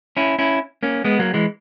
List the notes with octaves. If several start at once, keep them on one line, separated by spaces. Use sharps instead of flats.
C#4 E4
C#4 E4
A#3 C#4
G#3 B3
F#3 A#3
E3 G#3